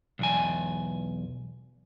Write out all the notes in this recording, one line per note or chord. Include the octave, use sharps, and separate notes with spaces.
B1 E2 G#5